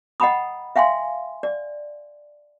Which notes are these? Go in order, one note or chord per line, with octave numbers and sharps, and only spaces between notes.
D#5 F#5 G5 A#5 B5 D#6
E5 F5 G5 G#5 C6
D5